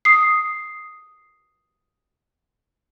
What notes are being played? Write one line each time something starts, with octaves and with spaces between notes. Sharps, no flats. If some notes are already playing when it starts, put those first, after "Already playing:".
D#6 C7